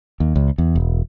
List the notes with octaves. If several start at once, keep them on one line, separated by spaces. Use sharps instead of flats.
D#2
C#2
E2
E1